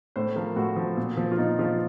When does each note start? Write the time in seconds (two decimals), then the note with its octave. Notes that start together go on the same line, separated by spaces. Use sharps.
0.16 A2 C5
0.36 F3 A#4
0.56 A2 F#4
0.76 F3
0.97 A#2
1.17 F3
1.32 F4
1.38 A#2 D#4
1.59 F3 F4